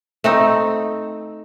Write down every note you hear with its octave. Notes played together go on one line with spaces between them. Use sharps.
A3 C4 D#4